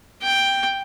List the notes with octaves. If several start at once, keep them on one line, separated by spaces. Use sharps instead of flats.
G5